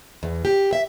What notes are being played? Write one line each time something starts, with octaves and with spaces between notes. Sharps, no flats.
E2
G4
E5